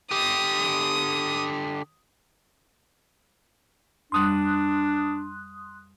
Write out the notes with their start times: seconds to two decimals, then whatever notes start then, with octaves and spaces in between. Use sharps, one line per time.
0.11 D3 G4 D#6
4.12 F2 G3 D4 C6 D#6 F#6